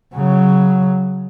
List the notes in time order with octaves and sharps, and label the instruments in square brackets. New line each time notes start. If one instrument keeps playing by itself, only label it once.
[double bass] C#3 F#3